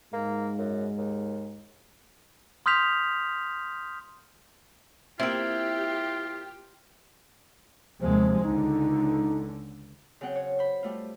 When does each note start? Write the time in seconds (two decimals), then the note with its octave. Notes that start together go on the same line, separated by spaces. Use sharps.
0.13 G#2 G#3 A#3
0.58 F#2
0.97 D#2
2.66 C6 D#6 F6 G6 B6 F7
5.20 A#3 C4 E4 F4 G4 G5
8.02 D#2 C3 F3 G#3
8.44 C#2 D3 D#4
10.21 C#3 F#3 C4 F#5 G5
10.35 C#5
10.59 C5 B5
10.83 G3 A3 F4